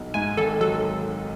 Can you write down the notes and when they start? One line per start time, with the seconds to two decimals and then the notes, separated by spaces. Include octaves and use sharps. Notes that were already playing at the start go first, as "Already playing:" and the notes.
Already playing: B1
0.14 G#2 G#5
0.37 G#1 A4
0.60 F#3 A4